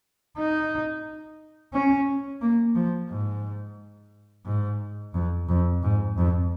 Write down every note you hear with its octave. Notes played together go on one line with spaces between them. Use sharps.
D#4
C#4
A#3
F3
G#2
G#2
F2
F2
G#2
F2